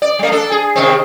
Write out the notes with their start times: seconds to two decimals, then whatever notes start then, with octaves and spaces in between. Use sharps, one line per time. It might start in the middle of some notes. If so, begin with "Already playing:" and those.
0.02 D5
0.19 G3 A3
0.32 D4 A4
0.51 G#4
0.76 C3 D#3 C4